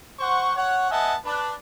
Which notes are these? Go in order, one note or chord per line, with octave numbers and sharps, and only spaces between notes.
C5 F#5 C#6
C#5 F#5
B3 D#5 E5 F#5 G#5 A5
D4 B4